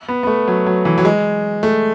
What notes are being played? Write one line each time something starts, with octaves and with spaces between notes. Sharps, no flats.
B3
B3
A3
F#3
F#3
E3
F#3
G#3
A3